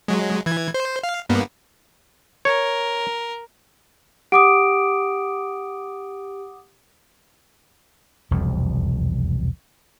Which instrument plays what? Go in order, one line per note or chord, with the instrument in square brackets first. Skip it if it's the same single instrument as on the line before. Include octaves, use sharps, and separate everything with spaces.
[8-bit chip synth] F#3 G#3
E3 G#6
C5
F5
G2 A#3 B3
[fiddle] A#4 [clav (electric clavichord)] C#5
[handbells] G4 D7 [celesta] F#5 D6 D#6
[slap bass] E1 C2 F2 F3